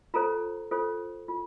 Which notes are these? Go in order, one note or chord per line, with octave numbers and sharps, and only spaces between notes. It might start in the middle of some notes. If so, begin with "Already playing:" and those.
F4 A4 C5 A#5
F4 A4 C5
F4